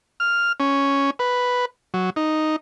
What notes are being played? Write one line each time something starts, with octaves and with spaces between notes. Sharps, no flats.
F6
C#4
B4
F#3
D#4